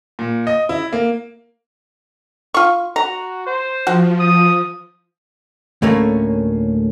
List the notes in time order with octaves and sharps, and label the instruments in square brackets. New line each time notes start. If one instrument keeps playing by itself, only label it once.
[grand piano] A#2
D#5
E4
A#3
[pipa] F4 C#6
[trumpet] F#4 [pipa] A#5
[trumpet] C5
[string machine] F3 [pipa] F#4
[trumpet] D#6
[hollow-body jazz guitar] D2 A2 A3 A#3 C#4